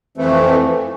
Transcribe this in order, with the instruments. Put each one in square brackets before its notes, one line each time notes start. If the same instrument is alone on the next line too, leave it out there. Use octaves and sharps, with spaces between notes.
[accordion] F2 E3 A3 [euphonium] C4